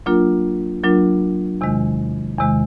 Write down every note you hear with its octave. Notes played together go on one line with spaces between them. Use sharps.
F#3 A#3 D4 F4 A#4
F#3 A#3 D4 F4 A#4
E2 C3 D#3 G#3
E2 C3 D#3 G#3